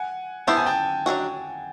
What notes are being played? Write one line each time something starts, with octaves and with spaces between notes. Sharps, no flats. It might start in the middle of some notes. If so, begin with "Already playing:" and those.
Already playing: F#5 G#5
B3 E4 G4 C5 A5
G#5
G5 A5
F#3 A3 D4 F#4